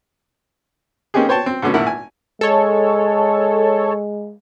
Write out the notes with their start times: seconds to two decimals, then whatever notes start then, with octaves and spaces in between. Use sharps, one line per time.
1.14 A#3 C4 C#4 D#4 G4 G#4
1.29 C5 C#5 G5 A5
1.46 C4
1.62 B2 D3 A3 C#4
1.74 G#1 A#2 E4 A#4 F#5
1.87 G#5
2.41 G#3 A4 C#5